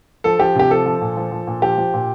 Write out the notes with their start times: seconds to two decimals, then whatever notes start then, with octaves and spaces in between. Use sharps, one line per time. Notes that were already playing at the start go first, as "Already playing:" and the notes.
0.24 F3 A4
0.39 F3 G4
0.55 C3 G4
0.70 F3 A4
0.86 F3
1.02 A#2
1.17 F3
1.32 F3
1.47 A#2
1.62 F3 G4
1.78 F3
1.94 A#2